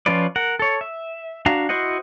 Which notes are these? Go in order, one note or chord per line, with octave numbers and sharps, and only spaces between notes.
F3 C#4 F4 B4 D5
A#4 F#5
A4 C#5
E5
D4 F#4 F5 A#5
E4 F#4 C5 D#5 F#5